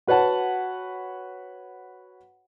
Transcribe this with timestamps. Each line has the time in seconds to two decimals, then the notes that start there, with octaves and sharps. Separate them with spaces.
0.07 F#4 B4 C#5 F#5 A5